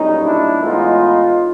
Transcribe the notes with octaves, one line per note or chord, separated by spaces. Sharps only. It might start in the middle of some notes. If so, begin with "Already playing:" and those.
Already playing: B1 A#2 G3 C#4 D#4
D4 E4
A2 E3 G#3 B3 D#4 F4